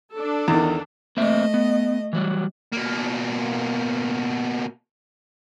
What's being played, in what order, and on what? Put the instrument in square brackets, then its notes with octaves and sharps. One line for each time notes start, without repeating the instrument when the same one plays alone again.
[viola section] D4 A4
[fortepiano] E2 D#3
[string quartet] A3 D#5 [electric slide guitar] A#3 C4 E5
[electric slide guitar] B3
E3 F#3 G3
[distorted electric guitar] B2 A#3